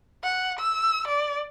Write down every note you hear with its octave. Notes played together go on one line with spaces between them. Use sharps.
F#5
E6
D5